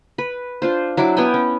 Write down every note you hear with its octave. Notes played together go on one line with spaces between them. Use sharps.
B4
D4 F4 C5
F#3 D4 E4 D6
B3 C#5 G5 G#5
C#4